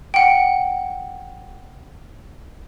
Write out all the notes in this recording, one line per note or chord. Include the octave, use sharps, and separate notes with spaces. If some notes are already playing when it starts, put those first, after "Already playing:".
F#5 G5